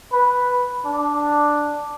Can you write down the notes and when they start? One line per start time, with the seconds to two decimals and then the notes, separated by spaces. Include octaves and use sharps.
0.13 B4
0.85 D4